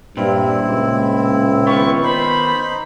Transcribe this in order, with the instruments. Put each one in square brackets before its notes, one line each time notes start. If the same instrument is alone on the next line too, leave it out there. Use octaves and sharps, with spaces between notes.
[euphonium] G2 [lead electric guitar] A#2 [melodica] C4 E4
[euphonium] C#2
[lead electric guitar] D#3 B3 [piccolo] C#6
[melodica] D#4 C5 [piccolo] B5